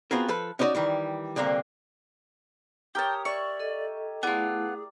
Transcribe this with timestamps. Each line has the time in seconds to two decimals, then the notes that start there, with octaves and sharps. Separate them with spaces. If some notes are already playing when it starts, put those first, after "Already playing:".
0.11 B3 C4 F4 F#4 G#4 A#4
0.28 F3 A4 B4
0.59 C#4 D#4 E4 F#4 D5
0.75 D#3 E3 G3
1.36 C2 A#2 D3 A#3 C4
2.95 G4 A#4 C#5 G5 A5 D#6
3.25 D5 E5 C#6
3.60 A4 D#5
4.23 A3 B3 E4 F4 G#4 D5